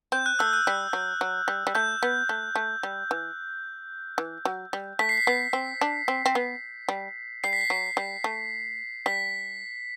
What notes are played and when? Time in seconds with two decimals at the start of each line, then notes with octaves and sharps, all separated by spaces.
0.12 C4 G6
0.26 F#6
0.39 A3 E6
0.53 F#6
0.67 G3
0.93 F#3
1.21 F#3
1.48 G3
1.67 G3
1.75 A3 G6
2.03 B3
2.29 A3
2.55 A3
2.83 G3
3.11 E3
4.18 E3
4.45 F#3
4.73 G3
4.99 A3 B6
5.09 C7
5.18 B6
5.27 B3
5.53 C4
5.81 D4
6.08 C4
6.26 C4
6.35 B3
6.89 G3
7.44 G3 C7
7.53 B6
7.61 C7
7.70 F#3
7.97 G3
8.24 A3
9.06 G3 B6